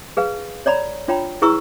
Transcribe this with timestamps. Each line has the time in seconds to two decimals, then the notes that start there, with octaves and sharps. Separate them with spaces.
0.17 G#4 B4 F5
0.66 C#5 D5 A#5 B5
1.08 D4 F4 C#5 G5 A#5 B5
1.42 E4 G#4 B4 A#5 C#6 E6